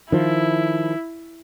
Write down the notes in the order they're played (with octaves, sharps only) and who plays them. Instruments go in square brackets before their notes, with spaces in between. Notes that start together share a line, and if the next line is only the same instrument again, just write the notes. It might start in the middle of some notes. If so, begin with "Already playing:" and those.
[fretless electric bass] D#3 F3 [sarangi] E4